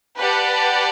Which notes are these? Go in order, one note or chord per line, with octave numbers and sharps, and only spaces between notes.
G4 B4 D5 F#5 A5